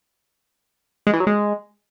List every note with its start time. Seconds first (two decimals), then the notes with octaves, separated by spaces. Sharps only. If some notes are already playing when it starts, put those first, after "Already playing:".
1.07 G#3
1.13 E3
1.20 F#3
1.27 G#3